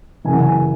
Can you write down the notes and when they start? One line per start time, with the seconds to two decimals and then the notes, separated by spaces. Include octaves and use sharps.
0.25 F#2 C#3 E3 G#5
0.33 F#5
0.42 G#5